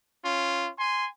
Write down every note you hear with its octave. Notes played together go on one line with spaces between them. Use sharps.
C#4 F4
G#5 C6